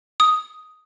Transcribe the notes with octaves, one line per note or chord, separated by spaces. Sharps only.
D#6